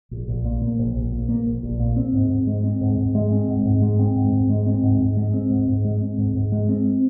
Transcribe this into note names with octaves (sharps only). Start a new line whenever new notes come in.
A#1
A#1
A#2
A#3
A#1
A#1
A#2
A#3
A#1
A#1
A#2
C4
G#2
G#2
G#3
C4
G#2
G#2
G#3
C4
G#2
G#2
G#3
C4
G#2
G#2
G#3
C4
G#2
G#2
G#3
C4
G#2
G#2
G#3
C4
G#2
G#2
G#3
C4